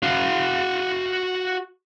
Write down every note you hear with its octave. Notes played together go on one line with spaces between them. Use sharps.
F#4 F5